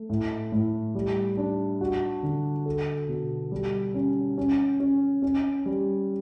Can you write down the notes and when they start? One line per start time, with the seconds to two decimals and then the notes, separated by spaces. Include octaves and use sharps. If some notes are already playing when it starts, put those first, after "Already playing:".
Already playing: A3
0.10 A2
0.52 A2
0.95 G3
1.37 D4
1.81 F#4
2.23 D3
2.66 A4
3.09 B2
3.51 G3
3.94 C#4
4.38 C#4
4.80 C#4
5.22 C#4
5.66 G3